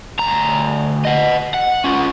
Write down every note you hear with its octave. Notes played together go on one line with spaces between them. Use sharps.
D2 A#5
D#5 F#5
F#5
C#4 F4